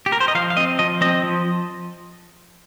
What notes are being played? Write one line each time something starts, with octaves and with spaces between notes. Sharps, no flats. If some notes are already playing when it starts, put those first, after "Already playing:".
G4
A#4
C5
D#5
F3 F5
F5
C4 D#5
F3 D#5
C4 D#5
F3